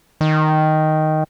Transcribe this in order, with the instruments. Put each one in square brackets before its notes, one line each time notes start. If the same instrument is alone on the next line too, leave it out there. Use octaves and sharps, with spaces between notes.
[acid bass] D#3